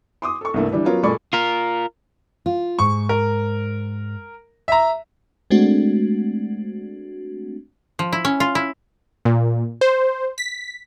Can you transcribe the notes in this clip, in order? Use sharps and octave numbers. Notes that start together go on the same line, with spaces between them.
C6 D6 D#6
A4 C#6
C2 G2 A3 A#3
E3 G3 D4 B4
F#3 B3 C#4 F4 A#4 C#5
A#2 G#3 A4 D5 B5 C#6
F4 A#4
F4
G#2 C#6
A#4
E5 A#5
G#3 A3 C4 D4 F#4
F3
E4
C#4
F4
E4
A#2
C5
B6